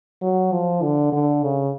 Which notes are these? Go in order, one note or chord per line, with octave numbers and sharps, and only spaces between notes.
F#3
F3
D3
D3
C#3